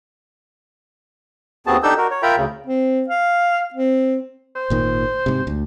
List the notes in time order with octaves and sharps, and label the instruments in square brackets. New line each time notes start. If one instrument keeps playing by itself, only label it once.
[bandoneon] D#2 B3 C4 F#4 G#4 A5
D4 D#4 G4 A4 E6 G6
F#4 A#4
C#5
F4 A#4 E5 G5 A#5 B5
D2 C#3
[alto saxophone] C4
F5
C4
[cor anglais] C5
[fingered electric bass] G#1 A#2 D#3
G#2 C3
D2